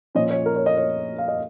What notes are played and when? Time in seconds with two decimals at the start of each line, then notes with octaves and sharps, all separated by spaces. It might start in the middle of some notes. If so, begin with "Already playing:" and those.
0.15 A#2 F3 C#4 D#5
0.31 C#5
0.46 A#4
0.56 C#5
0.66 D#5
0.77 C#5
1.18 F5
1.28 D#5